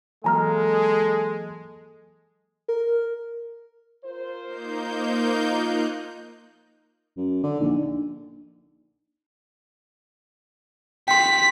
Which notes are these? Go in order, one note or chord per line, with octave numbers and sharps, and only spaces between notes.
E3 F#3 G#3 A#3 A4 G#5 A#5 F6
A#4
F4 A#4 C5
A#3 D#4 G6
F3 D#4 F4 F#6
F#2
D3
A#1 D4 D#4
G5 C6 B6